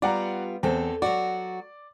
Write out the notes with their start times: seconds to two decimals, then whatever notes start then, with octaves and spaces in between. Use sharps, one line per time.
0.02 G3 B3 F4 D5 F#5 A#5
0.63 E2 C4 A4
1.02 F#3 F#4 D5